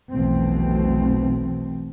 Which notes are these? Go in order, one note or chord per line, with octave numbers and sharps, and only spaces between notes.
F1 B1 B2 E3 A3 C4